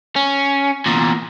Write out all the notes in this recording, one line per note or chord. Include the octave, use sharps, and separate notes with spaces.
C#4
E2 A#2